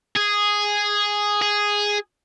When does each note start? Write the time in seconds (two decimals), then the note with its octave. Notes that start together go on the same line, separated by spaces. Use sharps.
0.16 G#4
1.42 G#4